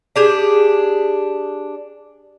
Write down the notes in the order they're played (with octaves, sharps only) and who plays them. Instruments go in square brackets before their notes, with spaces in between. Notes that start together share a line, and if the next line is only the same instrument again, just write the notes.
[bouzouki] D4 G4 G#4